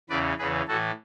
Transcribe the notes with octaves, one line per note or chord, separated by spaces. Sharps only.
E2 C#3 E3 B4 D5
E2 C#3 E3 G#4 B4
A2 E3 F#4 A4